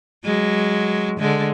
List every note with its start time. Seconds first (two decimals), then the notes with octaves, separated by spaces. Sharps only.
0.25 F#3 G#3
1.20 D3 G#3